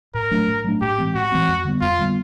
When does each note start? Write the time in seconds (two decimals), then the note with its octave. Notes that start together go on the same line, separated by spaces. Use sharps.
0.14 A2 A#4
0.31 F#3 A3 D4
0.48 A2
0.64 F#3 A3 D4
0.81 A2 G4
0.98 E3 G#3 C4
1.15 A2 F#4
1.32 E3 G#3 C4
1.48 F2
1.65 D3 G3 B3
1.81 F2 F4
1.98 D3 G3 B3